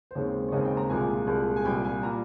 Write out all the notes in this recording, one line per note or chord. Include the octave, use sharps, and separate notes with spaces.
C5
D#2 C#3 G#3 C4 C#5
C#5
D#2 C#3 G#3 C4 D#5
G5
A#5
C2 A#2 G#3 G#5
C2 A#2 G#3
G#5
C2 A#2 G3 G5
G#5
A#2 G3 A#5